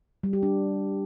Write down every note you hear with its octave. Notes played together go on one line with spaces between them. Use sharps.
G3
G4
D4